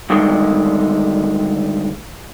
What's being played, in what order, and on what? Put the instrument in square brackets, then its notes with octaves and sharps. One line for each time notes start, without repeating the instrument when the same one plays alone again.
[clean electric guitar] D2 G2 D3 D#3 G#3